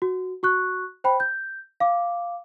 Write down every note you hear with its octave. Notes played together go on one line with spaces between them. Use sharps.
F#4
F#4 C#6 F#6
C5 G5 B5
G6
F5 D6